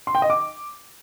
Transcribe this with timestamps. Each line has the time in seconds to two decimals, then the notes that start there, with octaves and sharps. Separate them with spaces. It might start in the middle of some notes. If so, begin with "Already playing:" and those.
0.07 C6
0.15 G5
0.22 D#5
0.30 D6